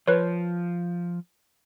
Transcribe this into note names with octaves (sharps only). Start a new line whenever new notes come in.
F3 B4 C#5